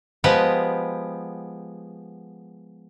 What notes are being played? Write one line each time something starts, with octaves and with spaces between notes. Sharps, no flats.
F3 G#3 B3 G4 B4 F#5